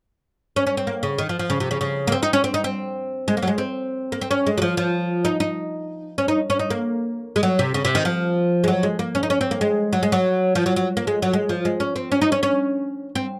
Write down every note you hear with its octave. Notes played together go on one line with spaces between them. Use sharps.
C#4
C#4
C4
A#3
C#3
D#3
F3
F3
C#3
C3
C#3
C#3
A#3
C4
D#4
C#4
C4
D#4
C4
G#3
A#3
F#3
G#3
C4
A#3
C4
C#4
G#3
F#3
F3
F3
D#4
D#4
C#4
D#4
C#4
D#4
A#3
G#3
F#3
C3
C#3
C3
D#3
F3
G#3
F#3
G#3
A#3
C#4
D#4
C#4
C4
A#3
G#3
F#3
G#3
F#3
F3
F#3
F#3
A#3
G#3
F#3
G#3
F3
G#3
C#4
C4
C#4
D#4
C#4
C#4
C4